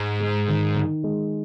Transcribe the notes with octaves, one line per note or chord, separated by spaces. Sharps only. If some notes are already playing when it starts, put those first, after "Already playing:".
Already playing: G#2
G#3
D#3
D#3
G#3